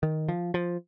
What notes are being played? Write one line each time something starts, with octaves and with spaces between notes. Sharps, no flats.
D#3
F3
F3